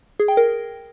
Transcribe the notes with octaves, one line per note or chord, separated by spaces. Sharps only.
G#4
G5
A#4